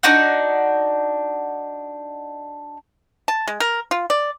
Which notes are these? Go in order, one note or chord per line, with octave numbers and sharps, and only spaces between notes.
D4 D#4 F#4 F#5
A5
G#3
A#4
F4
D5